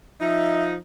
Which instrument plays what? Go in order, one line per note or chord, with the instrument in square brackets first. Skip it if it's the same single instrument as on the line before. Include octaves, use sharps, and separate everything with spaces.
[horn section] F3 D#4 [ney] E5